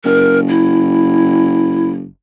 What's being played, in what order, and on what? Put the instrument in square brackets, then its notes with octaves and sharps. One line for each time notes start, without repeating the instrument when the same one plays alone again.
[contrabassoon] F#1 [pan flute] A#4
[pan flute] E4